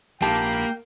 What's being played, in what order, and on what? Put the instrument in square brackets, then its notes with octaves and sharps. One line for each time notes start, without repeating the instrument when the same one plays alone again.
[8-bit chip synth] A#1 B5 [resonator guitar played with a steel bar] G#2 G4 A5 [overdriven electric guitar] A#3 [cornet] G5